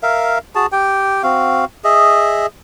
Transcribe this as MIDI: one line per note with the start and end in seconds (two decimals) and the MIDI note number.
0.03 0.38 70
0.03 0.38 76
0.03 0.38 77
0.55 0.66 66
0.55 0.66 68
0.55 0.66 81
0.72 1.23 67
0.72 1.23 79
1.23 1.65 60
1.23 1.65 66
1.23 1.65 77
1.84 2.46 68
1.84 2.46 75
1.84 2.46 76